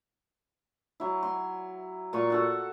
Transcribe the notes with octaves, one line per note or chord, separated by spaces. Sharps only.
F#3 E4
C6
A#2 F4 C#6
F#4 A4 F#5